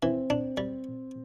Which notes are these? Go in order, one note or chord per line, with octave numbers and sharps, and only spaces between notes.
E3 C4
D4
G3